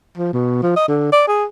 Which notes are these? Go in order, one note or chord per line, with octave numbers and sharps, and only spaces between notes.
F3
B2
F3
D#5
D3
D5
G#4